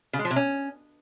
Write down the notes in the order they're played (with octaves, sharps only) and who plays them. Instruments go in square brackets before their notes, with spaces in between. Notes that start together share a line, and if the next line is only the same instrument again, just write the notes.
[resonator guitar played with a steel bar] C#3
G#3
F3
C3
C#4